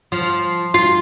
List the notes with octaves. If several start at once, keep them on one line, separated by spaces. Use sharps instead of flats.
F3
F4